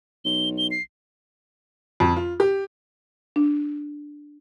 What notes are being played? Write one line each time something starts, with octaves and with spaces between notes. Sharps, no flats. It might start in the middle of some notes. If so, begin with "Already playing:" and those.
B1 G7
G7
C7
F2
F4
G4
D4